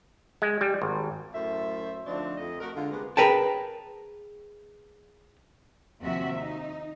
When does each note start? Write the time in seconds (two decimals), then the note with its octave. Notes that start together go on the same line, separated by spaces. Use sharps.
0.42 G#3
0.61 G3
0.82 G#1
1.35 F#2 A2 A3 C5 E5
2.06 D3 F3 A3 C4 D4 D#4
2.38 F2 D#5
2.60 A3 F#4 A#4
2.75 D3 G#3 F4
2.91 C3 G#3 A#3 B3
3.17 G#4 A#4 B4 G5 A5
6.02 D#2 C3 F3 F#4 E5
6.40 D#4